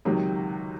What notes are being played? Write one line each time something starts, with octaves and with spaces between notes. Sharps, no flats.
C#2 C3 D#3 F#3